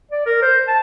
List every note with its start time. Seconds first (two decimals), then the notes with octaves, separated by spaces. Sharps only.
0.12 D5
0.26 A#4
0.42 C5
0.68 A5